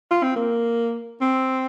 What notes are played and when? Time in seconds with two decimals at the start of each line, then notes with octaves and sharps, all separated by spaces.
0.11 F4
0.23 C4
0.36 A#3
1.21 C4